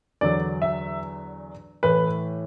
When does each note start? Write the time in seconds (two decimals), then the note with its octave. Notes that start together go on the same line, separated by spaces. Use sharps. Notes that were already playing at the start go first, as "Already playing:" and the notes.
0.21 E2 D3 F#3 D5
0.62 E5
1.83 A2 E3 A3 B4